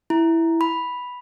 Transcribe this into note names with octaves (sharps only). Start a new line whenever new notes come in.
E4
B5